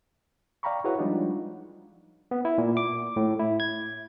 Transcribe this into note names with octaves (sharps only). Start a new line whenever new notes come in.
D5 F5 G5 A#5 B5 C#6
E4 F#4 G#4 B4 C#5 F#5
F3 G3 G#3 D4 D#4 F4
B3
E4
A#2
D6
A2
E4
G#6